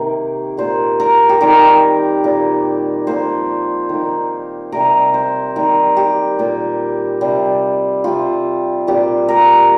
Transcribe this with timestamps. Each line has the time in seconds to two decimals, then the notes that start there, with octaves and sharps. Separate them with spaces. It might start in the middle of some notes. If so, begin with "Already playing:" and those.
Already playing: C3 D#3 A#3
0.57 A#2 A#3 C5
1.00 A#4
1.29 G4
1.41 D#3 G3 C4 A#4
2.24 A#2 A#3
3.07 A#2 F3 A#3 C5
3.89 D#3 A#3
4.72 C3 G3 C4 A#4
5.14 C5
5.56 D#3 G3 A#3 A#4
5.97 G4
6.39 A#2 G3 A#3
7.21 C3 G3 C4
8.04 C3 G3 C4 F4
8.87 A#2 G3 C4 G4
9.28 A#4